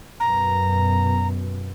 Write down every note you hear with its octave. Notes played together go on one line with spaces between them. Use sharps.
F#2 B2 A#5